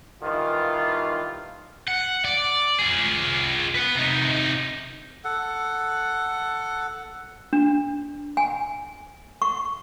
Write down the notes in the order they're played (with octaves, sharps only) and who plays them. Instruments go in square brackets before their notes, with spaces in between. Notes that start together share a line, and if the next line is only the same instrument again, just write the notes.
[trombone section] G2 D#3 E3 F4
[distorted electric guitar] F#5
D5
F4 G#4
B4 F#5
C3 D#4
[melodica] A4 F#5
[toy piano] D4
G#5
C#6